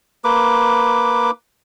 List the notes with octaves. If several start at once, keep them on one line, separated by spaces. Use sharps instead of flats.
A#3 B4 D6